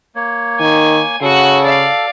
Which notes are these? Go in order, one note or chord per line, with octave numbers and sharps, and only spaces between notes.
A#3 C#5
D#3 G#5
C#3 F#4 A4 F#5
D5 F5